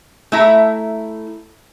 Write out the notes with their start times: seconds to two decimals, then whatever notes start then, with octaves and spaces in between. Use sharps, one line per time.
0.32 A3 E4 A#5